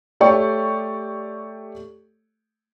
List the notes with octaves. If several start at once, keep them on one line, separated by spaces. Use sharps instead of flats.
A3 G4 C#5 D5 G5 C#6